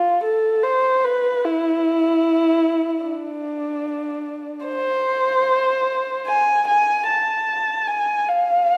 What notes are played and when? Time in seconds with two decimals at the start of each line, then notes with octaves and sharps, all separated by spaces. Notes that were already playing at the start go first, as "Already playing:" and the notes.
Already playing: F4
0.24 A4
0.63 C5
1.04 B4
1.44 E4
3.05 D4
4.66 C5
6.26 G#5
6.67 G#5
7.07 A5
7.87 G#5
8.28 F5